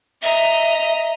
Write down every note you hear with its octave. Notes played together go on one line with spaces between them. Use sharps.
D#5 E5 A#5